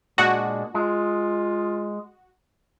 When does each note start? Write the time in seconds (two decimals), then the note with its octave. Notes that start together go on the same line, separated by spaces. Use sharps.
0.18 A#2 G#3 D4 F#4
0.75 G#3 F4